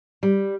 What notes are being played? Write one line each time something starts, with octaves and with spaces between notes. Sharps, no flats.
G3